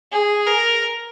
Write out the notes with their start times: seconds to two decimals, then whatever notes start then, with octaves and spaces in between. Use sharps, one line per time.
0.12 G#4
0.46 A#4